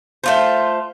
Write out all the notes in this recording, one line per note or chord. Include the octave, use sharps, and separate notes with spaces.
A3 F4 C5